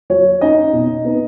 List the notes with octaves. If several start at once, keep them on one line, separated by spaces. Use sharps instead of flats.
F#3 C#5
C#4 D#4 D#5
B2
B3 D#4